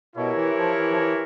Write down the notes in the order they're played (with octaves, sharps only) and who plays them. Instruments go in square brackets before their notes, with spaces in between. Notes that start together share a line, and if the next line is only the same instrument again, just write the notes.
[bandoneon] B2 [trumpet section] E4 G4 A#4 C#5
[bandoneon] E3
F3
E3
F3
E3